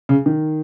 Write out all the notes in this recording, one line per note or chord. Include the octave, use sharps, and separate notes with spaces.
C#3
D#3